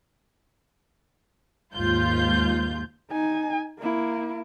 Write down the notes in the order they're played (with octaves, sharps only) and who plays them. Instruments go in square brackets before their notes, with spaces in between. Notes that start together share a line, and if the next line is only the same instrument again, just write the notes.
[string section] D#2 G#2 F4 G6
[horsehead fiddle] D#4 G#5
A#3 E4